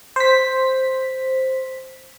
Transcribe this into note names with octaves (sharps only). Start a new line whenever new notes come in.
C5 B6